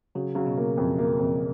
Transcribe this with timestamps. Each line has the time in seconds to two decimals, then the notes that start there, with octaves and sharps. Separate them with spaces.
0.15 C#3 F#3
0.35 C#3 F#3
0.46 B2
0.57 A#3
0.77 F2
0.98 A#3
1.19 F2